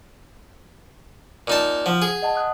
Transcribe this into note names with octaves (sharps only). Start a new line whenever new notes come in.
A#2 D#4 A5
F3 F#5
G#4
D#5 F#5 A5
D#6 F#6